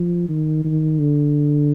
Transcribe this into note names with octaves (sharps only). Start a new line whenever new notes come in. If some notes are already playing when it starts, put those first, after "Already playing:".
Already playing: F3
D#3
D#3
D3